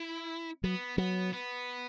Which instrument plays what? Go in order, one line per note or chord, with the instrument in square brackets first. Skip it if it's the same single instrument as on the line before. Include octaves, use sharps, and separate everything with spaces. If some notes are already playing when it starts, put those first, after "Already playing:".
Already playing: [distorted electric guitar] E4
[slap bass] F#3 [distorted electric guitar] B3
[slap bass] F#3 [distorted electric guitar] B3
[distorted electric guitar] B3